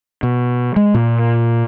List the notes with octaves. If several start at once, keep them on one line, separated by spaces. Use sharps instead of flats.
B2
G#3
A#2